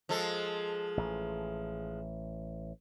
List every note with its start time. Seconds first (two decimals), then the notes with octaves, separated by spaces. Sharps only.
0.09 F3 G#3 A4
0.97 A1